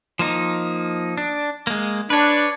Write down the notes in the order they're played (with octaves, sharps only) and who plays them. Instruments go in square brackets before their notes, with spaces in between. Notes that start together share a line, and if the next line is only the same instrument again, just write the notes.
[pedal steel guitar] F3 A#3 D#4
D4
G#3 A#3
[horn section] D4 [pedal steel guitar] B4 C#5